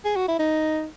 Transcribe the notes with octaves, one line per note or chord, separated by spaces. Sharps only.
G#4
F#4
E4
D#4